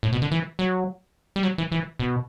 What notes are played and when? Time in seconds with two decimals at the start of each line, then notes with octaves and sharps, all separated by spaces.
0.03 A2
0.12 B2
0.22 D3
0.31 E3
0.59 F#3
1.36 G3
1.43 F#3
1.58 E3
1.72 E3
1.99 B2